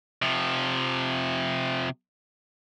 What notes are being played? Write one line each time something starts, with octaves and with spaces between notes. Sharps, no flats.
C3 F3